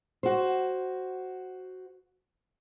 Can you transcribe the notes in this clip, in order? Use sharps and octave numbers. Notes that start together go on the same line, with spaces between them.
F#4 C5